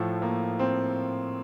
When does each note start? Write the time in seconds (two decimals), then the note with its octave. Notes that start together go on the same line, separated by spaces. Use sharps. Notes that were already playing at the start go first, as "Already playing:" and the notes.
Already playing: A2 F3 A3
0.22 A#3
0.59 C4